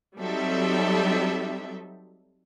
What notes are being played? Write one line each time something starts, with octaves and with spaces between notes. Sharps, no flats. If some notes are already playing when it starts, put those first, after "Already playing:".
F#3 G3 C4 D#4 A4 E5